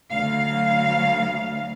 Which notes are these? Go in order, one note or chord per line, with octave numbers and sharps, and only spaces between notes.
D2 F#3 F5